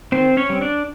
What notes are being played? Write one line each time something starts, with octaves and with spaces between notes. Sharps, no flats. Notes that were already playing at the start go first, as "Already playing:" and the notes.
D#3 C4 C5
C#4 C#5
G3 C4
D4 D5